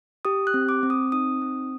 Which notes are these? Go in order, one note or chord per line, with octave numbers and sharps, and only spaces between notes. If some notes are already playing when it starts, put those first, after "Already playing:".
G4 D#6
F#6
C4
D6
C4
D#6
D#4 D#6
C4